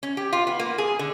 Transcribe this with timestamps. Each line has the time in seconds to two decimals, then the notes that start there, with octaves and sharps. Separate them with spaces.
0.03 C#4
0.17 G4
0.33 F4
0.47 B3
0.59 A#3
0.78 G#4
0.99 D3